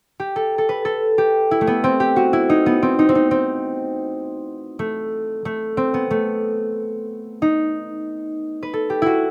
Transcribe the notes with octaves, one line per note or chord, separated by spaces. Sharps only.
G4
A4
A4
B4
A4
G4
E4
A3
B3
C4
G4
F#4
E4
D#4
B3
C4
D#4
C4
D#4
C4
A3
A3
C4
B3
A3
D#4
B4
A4
G4
E4 F#4